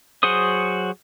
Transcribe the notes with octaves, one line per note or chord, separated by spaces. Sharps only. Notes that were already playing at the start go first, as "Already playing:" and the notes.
F#3 F#4 G#4 C5 D#6